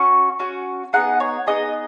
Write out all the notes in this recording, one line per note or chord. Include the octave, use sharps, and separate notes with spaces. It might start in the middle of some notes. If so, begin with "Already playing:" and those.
Already playing: C#4 F#4 C#6
C#4 F#4
B3 D#4 G#4 F#5
C#5
B3 D#4 G#4 D#5